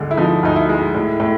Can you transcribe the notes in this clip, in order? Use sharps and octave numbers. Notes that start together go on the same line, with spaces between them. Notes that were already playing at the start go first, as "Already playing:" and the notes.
Already playing: D2 D3 G#3
E4
F3 D#4
D2 D#4
E4
G#3
A2
A2